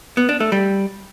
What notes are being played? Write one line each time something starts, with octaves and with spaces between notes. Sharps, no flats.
B3
D4
A3
G3